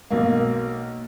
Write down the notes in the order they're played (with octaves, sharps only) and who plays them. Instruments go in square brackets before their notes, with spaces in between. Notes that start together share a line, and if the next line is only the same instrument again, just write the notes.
[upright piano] B1 A#3